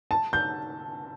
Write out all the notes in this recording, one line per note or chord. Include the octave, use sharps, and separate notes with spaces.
A5
G6